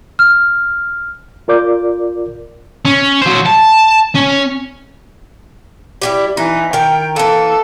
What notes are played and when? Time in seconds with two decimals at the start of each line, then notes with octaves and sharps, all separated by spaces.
0.19 F6
1.48 F4 A#4 D5 D6 G6
2.85 C#4
3.22 F#3 C5
3.46 A5
4.15 C#4
6.02 G3 E4 G4
6.37 E3 D#4
6.73 D#3 A#4 G5
7.16 E3 A#3 A4